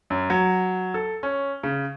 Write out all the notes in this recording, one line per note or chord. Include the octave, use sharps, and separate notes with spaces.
F#2
F#3
A4
C#4
C#3